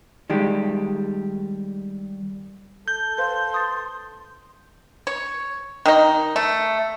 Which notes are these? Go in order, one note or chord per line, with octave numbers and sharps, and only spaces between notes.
D#3 G3 G#3 G4
A4 G6 G7
B4 C5 F5 C6
D#6 A6
C#5
D#3 D#4
A3